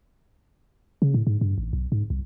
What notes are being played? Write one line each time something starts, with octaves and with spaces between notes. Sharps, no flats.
C#3
A2
G#2
G2
A1
B1
G#2
C2